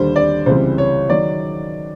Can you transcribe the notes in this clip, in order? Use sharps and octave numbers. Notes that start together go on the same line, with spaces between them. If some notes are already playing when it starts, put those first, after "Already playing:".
Already playing: D#2 D3 G3 C5
D5
C#2 C3 E3 G3 C5
C#5
D#3 F#3 D5